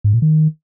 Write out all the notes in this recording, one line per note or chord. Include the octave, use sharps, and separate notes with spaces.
G#2
A#2
D#3